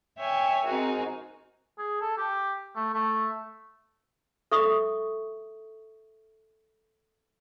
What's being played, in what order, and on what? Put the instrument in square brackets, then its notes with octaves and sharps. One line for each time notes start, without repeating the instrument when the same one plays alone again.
[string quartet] C#5 E5 G5 G#5
C4 D#4 F#4 G#4 A#4
[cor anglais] G#4
A4
G4
A3
A3
[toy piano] A4 E5 C#6 D#6